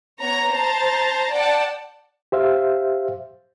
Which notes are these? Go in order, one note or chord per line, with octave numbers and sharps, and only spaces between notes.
B3 C#5 A#5
C5 A5 A#5 A6
D5 F#5 G5 A5
G4 C5 E5 F5